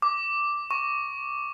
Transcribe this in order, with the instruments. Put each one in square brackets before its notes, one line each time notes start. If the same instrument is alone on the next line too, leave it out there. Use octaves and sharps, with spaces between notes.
[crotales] D6
C#6